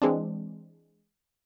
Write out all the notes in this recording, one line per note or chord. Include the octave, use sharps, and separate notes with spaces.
E3 G#3 C4 D4